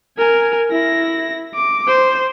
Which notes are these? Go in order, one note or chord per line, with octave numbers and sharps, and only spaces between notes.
A#4 G#5
E4 A#6
D6
C5